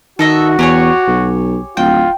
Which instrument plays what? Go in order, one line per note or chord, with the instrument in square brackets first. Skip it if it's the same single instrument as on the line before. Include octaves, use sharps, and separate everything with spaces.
[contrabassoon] D#3 [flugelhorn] F#4 [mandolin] A4 D#5 E5
[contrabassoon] E2 [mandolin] G4 G#4 C#5
[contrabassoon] B1
[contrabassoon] D1 [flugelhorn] F4 [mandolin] G5